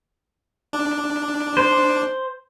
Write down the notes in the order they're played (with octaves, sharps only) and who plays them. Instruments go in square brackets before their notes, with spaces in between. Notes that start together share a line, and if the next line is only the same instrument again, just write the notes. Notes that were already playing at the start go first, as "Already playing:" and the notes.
[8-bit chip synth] D4
[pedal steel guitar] C5